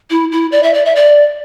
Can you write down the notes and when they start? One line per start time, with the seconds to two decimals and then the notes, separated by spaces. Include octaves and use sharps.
0.10 E4
0.32 E4
0.52 D5
0.63 E5
0.74 D5
0.85 E5
0.96 D5